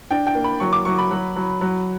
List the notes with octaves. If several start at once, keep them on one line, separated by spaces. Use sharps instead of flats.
D4 G5
G5
A#3
B5
F#3 C#6
D6
F#3 C#6
B5
F#3
F#3
F#3